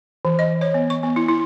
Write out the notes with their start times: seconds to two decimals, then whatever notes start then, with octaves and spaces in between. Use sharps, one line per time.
0.25 E3
0.39 D#5
0.61 C#5
0.74 B3
0.90 C#6
1.03 B3
1.16 E4
1.28 E4